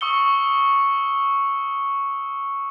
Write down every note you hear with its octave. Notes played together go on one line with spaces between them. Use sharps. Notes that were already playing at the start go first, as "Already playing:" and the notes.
C#6 D#6 E6 C#7 G7